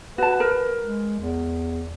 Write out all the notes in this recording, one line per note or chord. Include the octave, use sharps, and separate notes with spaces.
F#4 B4 A5
A#4
G#3
E2